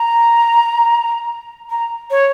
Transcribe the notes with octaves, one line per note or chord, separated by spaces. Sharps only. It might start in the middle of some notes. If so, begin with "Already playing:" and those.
Already playing: A#5
A#5
C#5